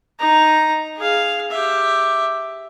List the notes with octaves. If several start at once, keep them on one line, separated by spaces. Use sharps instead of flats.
D#4 A#5
G#4 F5
G4 E5